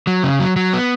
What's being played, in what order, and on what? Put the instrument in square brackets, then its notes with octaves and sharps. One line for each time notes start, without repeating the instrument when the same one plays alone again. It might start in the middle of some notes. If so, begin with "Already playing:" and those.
[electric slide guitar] F#3
C#3
F#3
F#3
B3